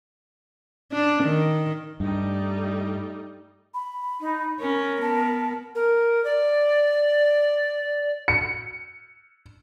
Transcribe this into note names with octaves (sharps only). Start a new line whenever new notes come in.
D4
D#3
G2 G3 A3 D#4
B5
D#4
C#4 A#4
B3 A5
A#4
D5
C#7